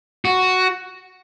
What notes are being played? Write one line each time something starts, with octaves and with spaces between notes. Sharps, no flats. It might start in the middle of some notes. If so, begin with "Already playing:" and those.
F#4